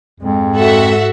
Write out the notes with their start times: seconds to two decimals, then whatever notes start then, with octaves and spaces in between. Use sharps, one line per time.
0.20 F2 G#2 G#3
0.56 F#4 A4 E5 F#5